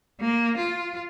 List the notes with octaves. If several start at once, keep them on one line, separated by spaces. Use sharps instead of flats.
A#3
F4